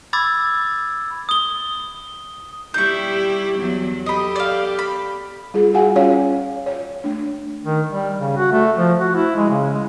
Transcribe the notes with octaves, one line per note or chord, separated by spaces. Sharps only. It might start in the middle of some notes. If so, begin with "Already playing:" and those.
B5 D6 E6 G#6 A6
D#6 G7
G3 E4 G4 C#6 G6
E2 F#3 B3
G4 A4 D#5 B5
D5 F5
B5
G3 F4 G#4
F#4 G#4 F5 F#5 G#5
C#4 F4 C#5 F5
C#5
A3 D4
D#3
G3
C#3
F#4
A3
F3
F#4
E4
G#3
C#3
G#3